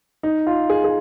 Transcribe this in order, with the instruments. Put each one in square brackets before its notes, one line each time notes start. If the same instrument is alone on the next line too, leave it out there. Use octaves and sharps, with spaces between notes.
[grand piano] D#4
F4
G#4
G#4